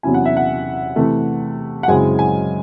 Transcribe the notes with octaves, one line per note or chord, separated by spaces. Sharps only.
E2 C3 F#3 C#4 E4 G#5
F#5
E5
F#5
C3 E3 A3
F#5
F#2 C#3 G#3 C4 E4 G#5
G#5